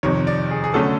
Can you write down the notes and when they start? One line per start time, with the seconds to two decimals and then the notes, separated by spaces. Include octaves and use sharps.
0.03 F2 C3 D#3 C#5
0.27 D5
0.51 G#4
0.64 G#4
0.74 D3 F#3 A3 C#4 A4